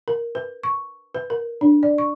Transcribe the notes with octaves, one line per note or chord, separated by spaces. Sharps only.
A#4
B4
C#6
B4
A#4
D4
D5
C#6